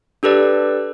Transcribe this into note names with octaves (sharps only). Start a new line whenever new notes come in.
D4 G4 A4 B4 D5